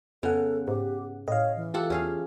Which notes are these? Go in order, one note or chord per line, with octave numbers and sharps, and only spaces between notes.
F2 C#3 B3 A4 F#5
G#2 G4
A2 C#5 D#5 F5
E3
F4 G4 A4 F#5 A5
E2 C#4 G#4 F5